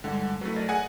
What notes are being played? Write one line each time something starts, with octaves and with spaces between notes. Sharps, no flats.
G2 D3 G#3 F#5
F#3 A3 E4 A4 B4
A#4 D5 D#5
G#4 F#5 G#5